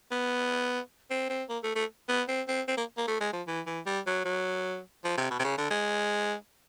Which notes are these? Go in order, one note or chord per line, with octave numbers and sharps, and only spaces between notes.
B3
C4
C4
A#3
A3
A3
B3
C4
C4
C4
A#3
A#3
A3
G#3
F3
E3
E3
G3
F#3
F#3
F3
C3
B2
C3
C#3
D3
G#3